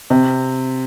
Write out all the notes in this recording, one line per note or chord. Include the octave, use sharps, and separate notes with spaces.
C3